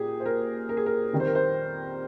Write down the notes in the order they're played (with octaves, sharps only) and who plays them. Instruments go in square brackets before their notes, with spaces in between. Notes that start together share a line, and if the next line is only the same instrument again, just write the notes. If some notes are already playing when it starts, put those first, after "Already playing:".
Already playing: [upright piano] A#2 G4 G#4
C5
A#4
A#4
G#4
A#4
F2 D#3 G3
C5
A#4
C5